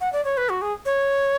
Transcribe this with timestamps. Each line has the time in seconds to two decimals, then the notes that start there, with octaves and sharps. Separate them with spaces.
0.01 F#5
0.12 D5
0.25 C#5
0.37 B4
0.49 F#4
0.62 G#4
0.85 C#5